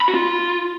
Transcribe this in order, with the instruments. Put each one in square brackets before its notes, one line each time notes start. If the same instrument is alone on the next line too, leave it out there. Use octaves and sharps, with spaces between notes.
[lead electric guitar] B5
F#4
F4